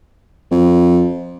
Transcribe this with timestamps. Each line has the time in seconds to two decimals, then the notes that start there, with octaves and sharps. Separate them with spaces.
0.51 F2